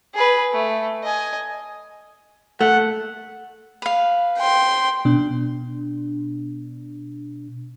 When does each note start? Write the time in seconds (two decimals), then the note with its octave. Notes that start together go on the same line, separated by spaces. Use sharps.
0.15 G#4 B4
0.52 A3
1.03 D#5 G#5
2.61 A3 F#5
3.82 B4 F5
4.39 G5 C6
5.05 B2 D4